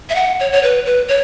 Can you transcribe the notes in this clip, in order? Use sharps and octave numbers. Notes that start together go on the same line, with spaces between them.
E5
F#5
C#5
C#5
B4
B4
C#5